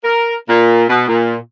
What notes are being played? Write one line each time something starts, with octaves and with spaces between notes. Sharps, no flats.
A#4
A#2
B2
A#2